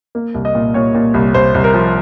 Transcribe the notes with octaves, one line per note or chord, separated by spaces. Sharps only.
A#3
C2
D#5
A#2
A#2 C#5
A#2
C2
C2 C5
C2
A#4
F3